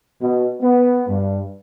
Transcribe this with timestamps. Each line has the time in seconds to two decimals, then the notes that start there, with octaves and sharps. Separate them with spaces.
0.22 B2
0.61 B3
1.08 G2